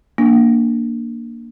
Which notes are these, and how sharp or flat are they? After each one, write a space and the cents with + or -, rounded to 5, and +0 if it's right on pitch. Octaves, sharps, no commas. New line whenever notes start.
A#3 +0 D4 +0